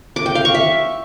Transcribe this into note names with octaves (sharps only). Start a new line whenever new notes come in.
D6
G5
F5
C#6
E5